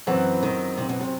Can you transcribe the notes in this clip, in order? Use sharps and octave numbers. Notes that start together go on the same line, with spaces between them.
F#2 E3 F#3 C4 F#4
D#3
C3
B2
C3